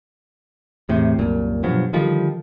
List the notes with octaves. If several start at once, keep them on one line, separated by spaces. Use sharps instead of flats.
E2 A2 C3
C2 F#2 A#2
G2 B2 F3 F#3
D3 D#3 F3 G3